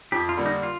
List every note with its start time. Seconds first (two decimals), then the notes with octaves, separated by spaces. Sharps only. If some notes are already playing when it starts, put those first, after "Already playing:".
0.12 F2 G4
0.29 F4
0.37 D3 G3 A#3
0.46 D#4
0.63 F4